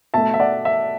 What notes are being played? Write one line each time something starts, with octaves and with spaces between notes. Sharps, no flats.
B2 A3 E5 A5
E5
D5 F#5
E5